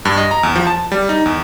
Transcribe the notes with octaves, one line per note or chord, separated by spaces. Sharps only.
G2
D#5
A#5
E2
F3
A5
G3
D#4
E2